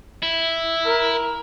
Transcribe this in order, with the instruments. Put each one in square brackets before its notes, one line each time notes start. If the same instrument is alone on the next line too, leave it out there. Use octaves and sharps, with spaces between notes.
[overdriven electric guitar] E4
[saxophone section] A#4